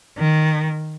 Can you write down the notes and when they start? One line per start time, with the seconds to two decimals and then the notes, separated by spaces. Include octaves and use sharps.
0.18 D#3